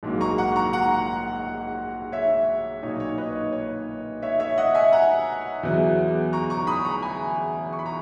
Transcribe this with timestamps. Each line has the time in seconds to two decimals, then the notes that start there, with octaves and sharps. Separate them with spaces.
0.03 A#1 G#2 F#3 A#3
0.21 A#5 C#6
0.38 F#5 A#5
0.56 A#5 C#6
0.73 F#5 A#5
2.12 C#5 E5
2.83 B1 A#2 A#3 D#4 C#5
3.00 C#5
3.18 B4 D#5
3.35 C#5
3.53 C#5
4.22 C#5 E5
4.40 C#5 E5
4.58 D#5 F#5
4.75 E5 G#5
4.92 F#5 A#5
5.63 E2 C#3 F#3 B3 E4
6.33 A#5 C#6
6.50 A#5 C#6
6.67 B5 D#6
6.85 A#5 C#6
7.02 G#5 B5
7.73 C#6
7.79 B5
7.86 A#5 C#6